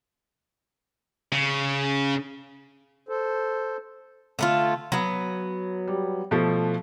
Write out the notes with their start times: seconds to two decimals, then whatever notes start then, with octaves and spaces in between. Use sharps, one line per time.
1.32 C#3
3.09 A4 C5
4.39 D3 A3 F4
4.92 F#3 B3
5.88 G3
6.31 B2 F3 A3